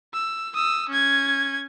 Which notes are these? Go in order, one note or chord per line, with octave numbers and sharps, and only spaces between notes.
E6
D#6 E6
C#4 G#6